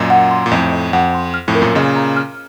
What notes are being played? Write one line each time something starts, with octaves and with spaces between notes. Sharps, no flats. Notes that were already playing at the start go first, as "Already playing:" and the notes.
Already playing: F#2 A#2 D#5
F#5
C6
A#2
F2 A2 D#5
D#5
F2 F#5
C6
F6
F2 A2
A#4
F#2 A#2
A#2 C#3 D#5
A#5
F6